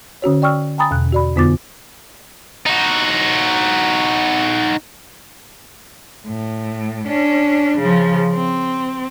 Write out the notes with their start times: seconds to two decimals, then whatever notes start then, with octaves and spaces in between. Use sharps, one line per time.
0.22 D3 C#4 F#4 C#5
0.42 D5 G5 C#6 E6 F6
0.78 G5 G#5 A#5 B5 D#6 A6
0.91 E2 B2 F#6
1.12 F#4 D5 B5
1.36 F2 D3 B3 F4 D6 A6
2.66 D#4 F#4
6.28 A2
7.06 C#4 D4
7.78 C#3 F3
8.32 C4